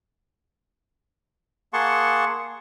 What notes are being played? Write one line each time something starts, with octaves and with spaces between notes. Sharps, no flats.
A#3 G#4 F#5 A5 C6 C#6